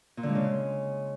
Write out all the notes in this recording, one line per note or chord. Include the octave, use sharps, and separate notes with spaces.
A#2
D3
G#3
C#3